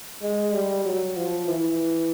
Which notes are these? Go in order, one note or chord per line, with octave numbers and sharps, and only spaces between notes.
G#3
G3
F#3
F3
E3